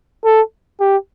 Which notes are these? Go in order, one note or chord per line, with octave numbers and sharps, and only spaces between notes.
A4
G4